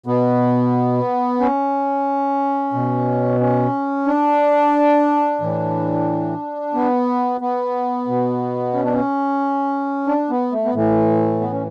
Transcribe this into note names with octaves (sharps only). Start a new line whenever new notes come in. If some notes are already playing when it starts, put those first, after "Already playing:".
B2 B3
C#4
B2
C#4
D4
A2 E3
B3
B3
B2
C#4
D4
C#4
D4
B3
A3
B3
A2 E3 A3
B3
C#4